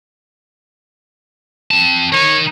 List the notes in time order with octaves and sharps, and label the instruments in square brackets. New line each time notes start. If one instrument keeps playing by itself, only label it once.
[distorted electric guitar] C4 A5
[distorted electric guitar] D#4 A#4 [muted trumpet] C#5